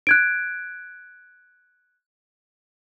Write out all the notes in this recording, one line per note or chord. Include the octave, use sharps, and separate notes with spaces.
F#6 G#6 D7